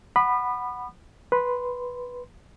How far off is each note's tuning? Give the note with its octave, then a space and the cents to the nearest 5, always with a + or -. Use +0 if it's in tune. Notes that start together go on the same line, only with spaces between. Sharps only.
F#5 +0 B5 +0 D#6 -40
B4 -5 C6 -10